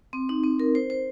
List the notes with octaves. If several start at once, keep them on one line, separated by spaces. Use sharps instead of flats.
C4
D#4
C4
A#4
C5
C5